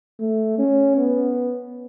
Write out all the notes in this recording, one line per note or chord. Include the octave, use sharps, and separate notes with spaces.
A3
C#4
B3